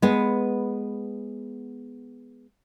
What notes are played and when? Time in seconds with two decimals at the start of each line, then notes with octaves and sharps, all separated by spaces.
0.02 G#3 B3